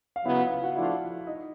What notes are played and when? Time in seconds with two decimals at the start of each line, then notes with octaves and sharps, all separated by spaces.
0.16 F5
0.25 C#3 F#3 B3 E4 E5
0.38 F4 F5
0.51 F4 F5
0.63 F#4 F#5
0.76 F3 A3 D4 E4 F4 E5
1.27 D#4 D#5